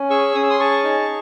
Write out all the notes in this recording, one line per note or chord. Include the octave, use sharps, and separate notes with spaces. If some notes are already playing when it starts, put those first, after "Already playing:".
Already playing: C#4
G#4 C#6 E6
C#4 D#6
E6
C6 D#6
G#4 A5 C#6
D#4